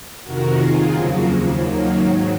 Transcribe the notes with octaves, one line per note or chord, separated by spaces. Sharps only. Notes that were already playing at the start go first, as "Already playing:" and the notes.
F2 C3 D#3 F#4 A#4
D#2 D#3 F4 G#4
F2 C#3 F3 F#3 A#3
D#2 C#3 F3
D#2 D#3 F#3 A#3
G#2 D#3 F#3